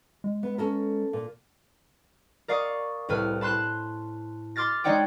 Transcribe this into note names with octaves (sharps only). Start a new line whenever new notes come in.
G#3
B3
C#4 A4 A#4
A#2
A#4 D5 F5 C#6 D#6
C2 A2 B4 F6
A5 B5 C6 F#6 E7
C6 D6 F6 A6 A#6
G#3 D#4 C#5 D5 F#5 G5